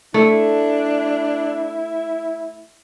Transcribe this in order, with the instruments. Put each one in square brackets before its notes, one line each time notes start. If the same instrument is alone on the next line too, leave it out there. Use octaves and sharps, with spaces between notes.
[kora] A3 [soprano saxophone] D4 [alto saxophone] E4